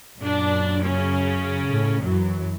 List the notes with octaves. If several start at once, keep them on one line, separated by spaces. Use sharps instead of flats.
F#2 A#2 D4
C#3 C#4
A2
F#2 E3 F#3